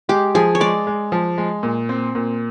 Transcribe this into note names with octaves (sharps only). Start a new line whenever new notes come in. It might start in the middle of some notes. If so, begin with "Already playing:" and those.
G#3 G4
F3 G#4
C#5
G#3 D5
G#3
F3
G#3
A#2
C4
A#2